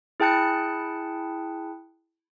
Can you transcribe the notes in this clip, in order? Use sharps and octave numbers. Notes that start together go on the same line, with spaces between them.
E4 G#4 G5 A5 F#6 C#7